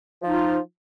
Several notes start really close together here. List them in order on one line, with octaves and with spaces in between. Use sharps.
F3 D#4 F4